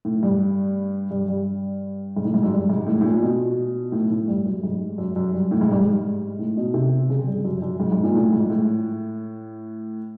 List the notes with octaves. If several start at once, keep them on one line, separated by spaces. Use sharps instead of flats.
A2
G2
G2
G2
G#2
A2
G#2
F#2
G2
G#2
A2
A2
A#2
B2
A2
A2
G2
F#2
G#2
F#2
F#2
G2
A2
G#2
G2
G#2
A2
B2
C3
C#3
G2
F#2
F#2
G#2
G#2
A#2
A2
G#2
A2